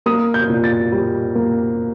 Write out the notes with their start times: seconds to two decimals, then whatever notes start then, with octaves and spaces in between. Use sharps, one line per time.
0.06 A#3 D#6
0.34 G6
0.49 A#2
0.64 A6
0.92 G3
1.35 A#3